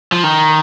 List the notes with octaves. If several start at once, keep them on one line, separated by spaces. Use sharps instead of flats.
F3
D#3